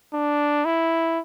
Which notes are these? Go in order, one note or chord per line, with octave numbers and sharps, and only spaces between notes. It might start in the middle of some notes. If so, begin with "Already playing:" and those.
D4
E4